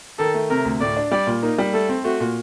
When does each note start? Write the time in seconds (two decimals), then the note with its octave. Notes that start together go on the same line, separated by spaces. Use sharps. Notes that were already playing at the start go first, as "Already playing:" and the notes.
0.19 D#3 A4
0.34 A3
0.50 C3 A#4
0.65 D2
0.81 A2 D5
0.97 D4
1.11 G3 D5
1.27 A#2
1.43 A#3 D#4
1.58 G3
1.73 A3 A4
1.89 C4
2.04 A3 F#4
2.20 A#2